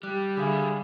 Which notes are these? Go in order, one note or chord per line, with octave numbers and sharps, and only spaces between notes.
G3 G4 F#6
D3 G#4 E5 F5 B5